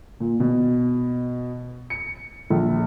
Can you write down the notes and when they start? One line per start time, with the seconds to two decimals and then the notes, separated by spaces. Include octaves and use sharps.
0.20 A#2
0.40 B2
1.90 C#7
2.50 A#1